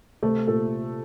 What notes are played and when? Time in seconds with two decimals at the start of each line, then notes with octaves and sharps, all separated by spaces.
0.23 C3 A3
0.47 A#2 A4